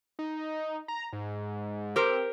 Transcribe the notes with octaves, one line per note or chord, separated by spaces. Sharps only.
D#4
A#5
G#2
C4 G4 A#4 C5